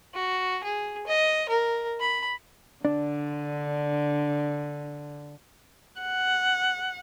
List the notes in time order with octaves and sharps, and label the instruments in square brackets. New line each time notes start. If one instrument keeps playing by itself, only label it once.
[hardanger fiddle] F#4
G#4
D#5
A#4
B5
[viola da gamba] D3 [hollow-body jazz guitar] D4
[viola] F#5